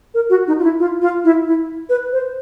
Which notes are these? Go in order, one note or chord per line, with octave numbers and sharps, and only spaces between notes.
A#4
F#4
D#4
F4
E4
F4
F4
E4
E4
B4
C5